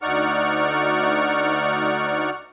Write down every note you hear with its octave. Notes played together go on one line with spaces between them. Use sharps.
D2 D#4 D5 F#5 C#6 F6